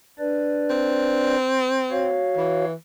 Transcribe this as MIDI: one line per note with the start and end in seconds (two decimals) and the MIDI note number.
0.19 1.36 62
0.19 1.36 71
0.19 1.36 74
0.69 2.19 60
1.91 2.65 66
1.91 2.65 73
1.91 2.65 77
2.37 2.74 52